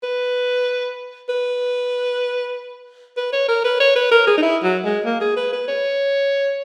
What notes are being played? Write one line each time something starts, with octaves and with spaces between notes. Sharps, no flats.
B4
B4
B4
C#5
A#4
B4
C#5
B4
A#4
G#4
D#4
E4
F#3
G#3
A#3
G#4
B4
B4
C#5